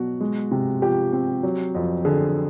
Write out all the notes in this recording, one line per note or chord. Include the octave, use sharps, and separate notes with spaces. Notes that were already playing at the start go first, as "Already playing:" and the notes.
Already playing: B2 F#3 F#4
G#3
C3
F3 G4
C4
F#3
F2
D3 G#4